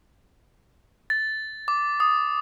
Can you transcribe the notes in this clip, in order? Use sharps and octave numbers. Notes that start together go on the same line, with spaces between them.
A6
D6
D#6